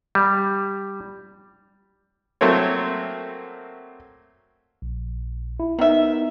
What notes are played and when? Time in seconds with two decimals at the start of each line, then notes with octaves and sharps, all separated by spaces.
0.15 G3
2.41 F#3 A3 A#3 C4 C#5
4.82 A#1
5.60 E4
5.79 D#3 B3 D#4 E5